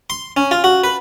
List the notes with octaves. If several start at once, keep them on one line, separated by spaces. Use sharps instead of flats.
C6
C#4
F4
F#4
B4